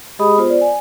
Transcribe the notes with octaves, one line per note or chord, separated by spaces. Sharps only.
G#3 G4 G#4 D#5 B5 D#6
B3 F4 C5
D5
G#5